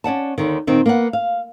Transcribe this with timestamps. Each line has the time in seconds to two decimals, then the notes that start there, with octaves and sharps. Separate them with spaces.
0.04 C#4 D5 F#5 A5
0.38 D#2 A#2 D3 D#3
0.67 A#2 D#3 C4 D#4
0.86 A#3 B3 F#5
1.13 F5